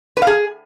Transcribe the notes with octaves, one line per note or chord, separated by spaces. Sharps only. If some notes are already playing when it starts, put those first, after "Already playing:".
B4
F5
G#4